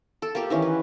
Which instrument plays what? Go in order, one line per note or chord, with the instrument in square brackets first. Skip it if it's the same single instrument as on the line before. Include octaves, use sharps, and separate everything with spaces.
[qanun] A4
A#3 F4 G4
D#3 E3 C#4
B4